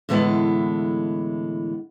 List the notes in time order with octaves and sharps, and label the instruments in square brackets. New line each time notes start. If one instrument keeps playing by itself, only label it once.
[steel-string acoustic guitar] A2 D3 E3 G#3 B3